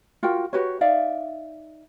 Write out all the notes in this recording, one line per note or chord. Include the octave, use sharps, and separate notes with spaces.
F4 F#4 A#4 G5
F#4 G4 B4 C#5
D#4 D5 E5 F5